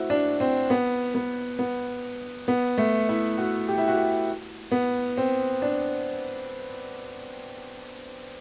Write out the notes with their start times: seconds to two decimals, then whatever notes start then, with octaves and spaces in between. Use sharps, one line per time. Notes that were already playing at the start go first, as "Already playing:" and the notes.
Already playing: A3 C4 E4 F#4
0.10 D4
0.40 C4
0.70 B3
1.15 B3
1.59 B3
2.48 B3
2.78 A3
3.09 E4
3.38 F#4
3.68 G4
3.78 E4
3.88 F#4
3.97 G4
4.72 B3
5.17 C4
5.62 D4